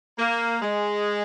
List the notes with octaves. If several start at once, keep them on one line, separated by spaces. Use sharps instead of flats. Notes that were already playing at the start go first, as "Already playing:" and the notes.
A#3
G#3